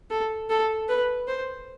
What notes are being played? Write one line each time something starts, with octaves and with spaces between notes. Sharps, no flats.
A4
A4
B4
C5